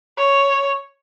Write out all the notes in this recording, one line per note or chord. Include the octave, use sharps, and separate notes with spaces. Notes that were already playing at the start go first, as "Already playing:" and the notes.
C#5